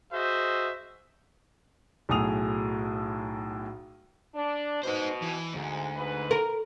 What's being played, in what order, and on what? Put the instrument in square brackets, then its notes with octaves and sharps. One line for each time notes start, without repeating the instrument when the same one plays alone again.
[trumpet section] F#4 G#4 C5 D#5 E5
[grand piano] B1 A2 G#4 D#6 F7
[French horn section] D4
[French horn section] B2 [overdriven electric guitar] D#4 C5
[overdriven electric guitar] E3
[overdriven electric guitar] D2 [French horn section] G#2
[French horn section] G#2 B4
[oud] A#4